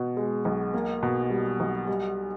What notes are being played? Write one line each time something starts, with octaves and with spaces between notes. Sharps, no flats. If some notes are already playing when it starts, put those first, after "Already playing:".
Already playing: B2 B3
G#3
B1
A#3
B2
G3
B1
G3